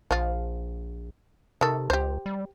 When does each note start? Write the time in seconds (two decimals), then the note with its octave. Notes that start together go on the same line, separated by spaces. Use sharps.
0.11 A#1 F3 F4
1.61 C3 D#3 A4
1.90 C#2 G4 C5
2.26 G3